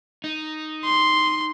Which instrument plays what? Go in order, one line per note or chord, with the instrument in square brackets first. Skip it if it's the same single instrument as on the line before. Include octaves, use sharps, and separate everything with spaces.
[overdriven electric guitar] D#4
[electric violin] C6